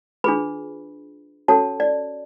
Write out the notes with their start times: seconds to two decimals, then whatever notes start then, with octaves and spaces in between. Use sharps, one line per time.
0.24 D4 F4 G#4 B4 B5
1.48 C#4 F#4 A4 C#5 A5
1.80 D5